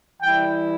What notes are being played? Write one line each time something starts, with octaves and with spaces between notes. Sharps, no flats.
E3 G3 E4 G5